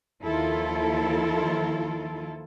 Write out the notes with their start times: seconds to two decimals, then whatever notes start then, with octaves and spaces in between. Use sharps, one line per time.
0.24 D#2 D#3 F3 E4 F4 A4